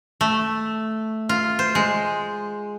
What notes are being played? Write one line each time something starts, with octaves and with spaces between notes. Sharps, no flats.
A3
F4
C5
G#3